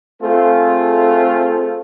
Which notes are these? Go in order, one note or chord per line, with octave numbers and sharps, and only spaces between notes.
A3 C4 F4 G#4 A4